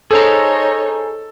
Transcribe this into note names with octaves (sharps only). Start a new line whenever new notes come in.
D#4 G#4 A4 C5 C#5 A#5